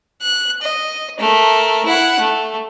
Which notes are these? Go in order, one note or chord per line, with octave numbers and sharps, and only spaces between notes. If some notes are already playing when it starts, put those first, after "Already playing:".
F#6
D#5
A3 A#4
E4 F#5
A3